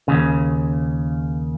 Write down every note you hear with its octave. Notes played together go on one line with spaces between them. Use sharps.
D#2 C#3